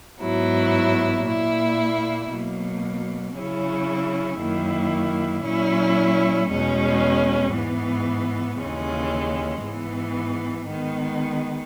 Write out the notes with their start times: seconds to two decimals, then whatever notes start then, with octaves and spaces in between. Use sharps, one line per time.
0.22 G#2 F#3 B3 E4
1.26 A#2 A#3 E4
2.31 B2 F#3 A#3
3.35 C#3 F#3 C#4 E4
4.40 F#2 D#3 A#3 E4
5.44 A#2 F#3 C#4 E4
6.50 E2 B2 G#3 C#4
7.54 G#2 E3 B3
8.59 D#2 C#3 E3 G#3 C#4
9.63 G#2 E3 B3
10.68 D#3 G#3 B3